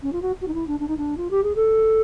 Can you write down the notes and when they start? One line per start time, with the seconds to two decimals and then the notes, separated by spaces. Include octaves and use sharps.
0.03 C#4
0.13 F4
0.22 F#4
0.42 F#4
0.48 D#4
0.54 E4
0.67 D4
0.80 D4
0.88 D#4
0.97 D4
1.17 F4
1.31 G4
1.43 G#4
1.56 A4